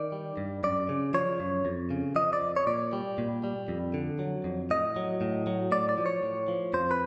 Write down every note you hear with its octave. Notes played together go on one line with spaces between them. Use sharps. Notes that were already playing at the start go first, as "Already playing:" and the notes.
Already playing: D#3 D5
G3
G2
F#2 D5
C#3
F3 C#5
F#2
F2
C#3
F3 D#5
D5
F2
C#5
A#2 D5
G3
A#2
G3
F2
D3
F#3
F2
A2 D#5
F#3
A2
F#3
A2 D5
D5
F3
C#5
A2
F3
F2 C5
B4